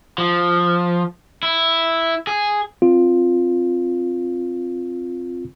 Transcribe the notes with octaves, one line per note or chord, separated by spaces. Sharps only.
F3
E4
G#4
C4 F4